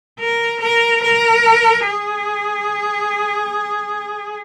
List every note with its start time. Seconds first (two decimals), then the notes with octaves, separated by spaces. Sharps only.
0.19 A#4
0.61 A#4
1.03 A#4
1.86 G#4